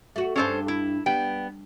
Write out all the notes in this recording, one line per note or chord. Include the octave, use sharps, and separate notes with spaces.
A3 F#4
G2 C#4 D4 A4 C5
E4
G3 B3 G5